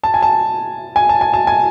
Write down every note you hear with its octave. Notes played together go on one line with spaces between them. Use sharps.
A5
G#5
A5
G#5
A5
G#5
A5
G#5